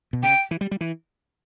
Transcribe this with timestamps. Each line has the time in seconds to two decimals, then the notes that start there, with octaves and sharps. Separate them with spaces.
0.13 B2
0.23 C#3 G5
0.51 E3
0.61 G3
0.71 G3
0.81 E3